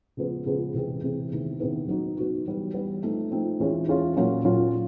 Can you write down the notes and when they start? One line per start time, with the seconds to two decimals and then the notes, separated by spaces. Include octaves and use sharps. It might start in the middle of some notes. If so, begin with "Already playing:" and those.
0.17 C#3 F3 G#3 B3
0.46 C#3 F3 G#3 B3
0.74 C3 E3 G#3 C4
1.03 C3 E3 G#3 C4
1.31 C3 D#3 G#3 B3 E4
1.60 C3 D#3 G#3 B3 E4
1.88 F#3 B3 D#4 F#4
2.17 F#3 B3 D#4 F#4
2.45 E3 G3 B3
2.74 E3 G3 B3
3.02 F3 A3 C4 D#4
3.31 F3 A3 C4 D#4
3.60 E3 G#3 C#4 F4
3.88 E3 G#3 C#4 F4
4.16 A#2 F#3 A#3 C#4 F4
4.45 A#2 F#3 A#3 C#4 F4